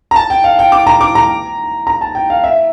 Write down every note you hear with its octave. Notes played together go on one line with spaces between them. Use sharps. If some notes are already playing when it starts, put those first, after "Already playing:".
A#5
A5
G5
F5
G5
D6
A#5
D6
A#5
A#5
A5
G5
F5
E5